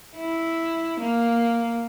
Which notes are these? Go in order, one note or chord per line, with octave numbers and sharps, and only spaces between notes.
E4
A#3